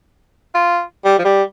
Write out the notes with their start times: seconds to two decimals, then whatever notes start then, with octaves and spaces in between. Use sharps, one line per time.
0.54 F4
1.05 G3
1.19 F3
1.24 G3